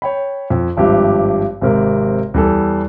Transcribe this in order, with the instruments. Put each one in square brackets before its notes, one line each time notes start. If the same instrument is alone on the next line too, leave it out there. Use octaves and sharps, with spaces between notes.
[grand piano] C#5 G5 B5
F2
G#1 G2 F3 G4 E5
G#1 G#2 C3 A#4
E2 G3 A4